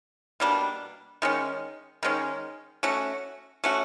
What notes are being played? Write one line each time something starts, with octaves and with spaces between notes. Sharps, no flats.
B2 G3 A#3 D4
D#3 G#3 C#4
D#3 G#3 C#4
A3 C#4 F#4
A3 C#4 F#4